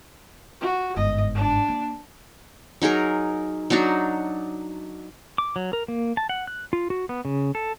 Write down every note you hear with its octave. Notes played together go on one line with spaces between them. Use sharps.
F#4
G1 G#2 D#5
D4
A#3
F#3 D#4 G#4 A#4
F#3 D4 D#4 F#4
D6
F#3
A#4
A#3
A5
F#5
F#6
F4
F#4
B3
C#3
A4